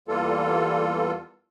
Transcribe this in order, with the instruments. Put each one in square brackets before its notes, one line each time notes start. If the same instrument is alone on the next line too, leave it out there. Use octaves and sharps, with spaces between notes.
[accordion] E2 E3 G3 A#3 F4 A4